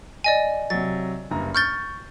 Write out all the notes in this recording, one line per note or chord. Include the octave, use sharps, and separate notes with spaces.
D5 D#5 G#5
C3 F#3 A6
F#1 G2 A#5
C#6 F6 G6 A6 G7